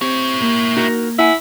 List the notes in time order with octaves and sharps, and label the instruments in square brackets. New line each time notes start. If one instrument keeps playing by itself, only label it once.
[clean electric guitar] C4 [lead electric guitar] E4 C#5 [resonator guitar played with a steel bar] G4
[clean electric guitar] A#3
[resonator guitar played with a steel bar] D#4 F#4 A#4
[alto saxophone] E4 [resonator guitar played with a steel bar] F#5 G#5